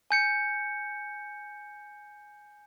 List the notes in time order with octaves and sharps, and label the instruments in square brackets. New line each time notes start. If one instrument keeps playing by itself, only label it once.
[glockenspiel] G#5 G6 C#7